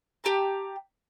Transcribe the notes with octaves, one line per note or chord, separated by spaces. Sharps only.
G4 A5 A#5